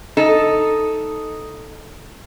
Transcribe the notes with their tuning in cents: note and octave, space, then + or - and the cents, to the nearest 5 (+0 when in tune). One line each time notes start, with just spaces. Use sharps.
D#4 +0 A4 +0